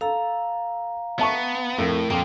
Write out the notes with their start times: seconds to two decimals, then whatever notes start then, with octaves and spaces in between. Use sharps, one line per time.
0.01 A4 F5 A#5
1.19 B3 E5 A5 C#6
1.79 F2 A2 A#4
2.10 F2 A#3 F4 G5